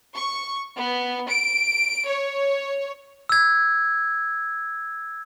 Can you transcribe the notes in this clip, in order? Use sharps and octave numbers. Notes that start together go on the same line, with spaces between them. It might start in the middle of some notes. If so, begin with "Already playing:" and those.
C#6
B3
D7
C#5
E6 G#6